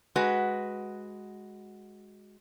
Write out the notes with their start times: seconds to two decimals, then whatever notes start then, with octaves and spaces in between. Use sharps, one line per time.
0.16 G#3 F#4 B4